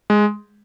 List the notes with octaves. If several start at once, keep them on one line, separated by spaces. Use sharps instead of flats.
G#3